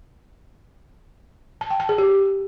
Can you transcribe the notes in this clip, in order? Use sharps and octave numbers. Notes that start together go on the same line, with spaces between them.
A5
G5
A5
G#4
G4